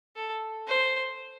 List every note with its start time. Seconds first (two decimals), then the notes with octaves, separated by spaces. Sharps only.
0.16 A4
0.68 C5